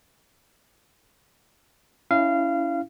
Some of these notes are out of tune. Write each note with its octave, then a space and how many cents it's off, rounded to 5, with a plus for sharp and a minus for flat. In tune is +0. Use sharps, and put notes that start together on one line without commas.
C#4 +25 E4 +0 F5 -20